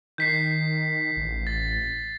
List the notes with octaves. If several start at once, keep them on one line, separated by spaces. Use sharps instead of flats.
D#3 G6 B6 C7
A1
A6